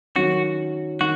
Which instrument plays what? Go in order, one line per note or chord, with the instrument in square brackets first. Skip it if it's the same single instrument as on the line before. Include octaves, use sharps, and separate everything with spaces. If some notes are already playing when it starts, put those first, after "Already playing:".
[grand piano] D#3 F#3 C#4 [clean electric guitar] F#4
[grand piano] D#3 [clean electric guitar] F#4